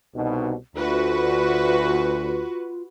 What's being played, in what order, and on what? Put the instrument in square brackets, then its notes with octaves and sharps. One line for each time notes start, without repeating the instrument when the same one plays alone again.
[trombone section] C2 B2 [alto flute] D#4
[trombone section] D2 [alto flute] F4 [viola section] F#4 B4